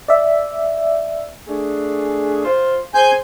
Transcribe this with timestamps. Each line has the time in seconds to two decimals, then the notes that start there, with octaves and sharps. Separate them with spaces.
0.08 D5 E5
1.47 A3 D4 G#4
2.44 F4 C5
2.94 G#4 C5 G#5 G6